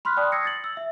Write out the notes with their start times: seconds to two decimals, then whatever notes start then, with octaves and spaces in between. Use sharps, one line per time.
0.05 B5 C6 F6 F#6 B6
0.17 D5 G5 A5 C#6 D#6 F#6
0.32 D#6 E6 G#6 A#6 C7 C#7
0.45 A6 C#7 F#7
0.64 E6
0.77 E5